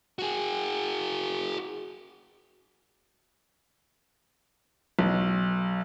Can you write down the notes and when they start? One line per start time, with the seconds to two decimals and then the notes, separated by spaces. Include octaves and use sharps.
0.19 F#4 G#4
4.99 B1